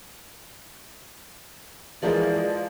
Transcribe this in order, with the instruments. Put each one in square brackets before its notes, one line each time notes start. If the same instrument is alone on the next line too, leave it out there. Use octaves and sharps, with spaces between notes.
[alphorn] E3 [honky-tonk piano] F3 G#3 [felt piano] G#4 A#4 [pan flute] D5